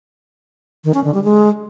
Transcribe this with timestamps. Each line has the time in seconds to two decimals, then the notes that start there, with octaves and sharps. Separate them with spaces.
0.84 D#3
0.94 C#4
1.04 D3
1.14 G3
1.24 G#3